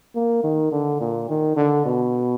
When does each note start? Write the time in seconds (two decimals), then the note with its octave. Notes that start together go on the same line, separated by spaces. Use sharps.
0.15 A#3
0.44 D#3
0.72 D3
1.00 A#2
1.29 D#3
1.56 D3
1.85 B2